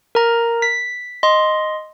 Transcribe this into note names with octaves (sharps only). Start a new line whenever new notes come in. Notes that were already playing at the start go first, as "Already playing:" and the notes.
A#4 A#5
B6
D#5 C6